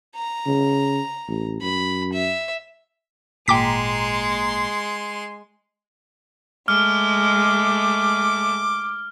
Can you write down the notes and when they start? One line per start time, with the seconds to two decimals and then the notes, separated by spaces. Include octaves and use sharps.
0.16 A#5
0.46 C#3
1.28 A1
1.61 F#2 B5
2.13 E5
3.48 G#1 A#2 G#3 G5 A#5 C6 D6 B6
6.68 G#3 A3 D6 F6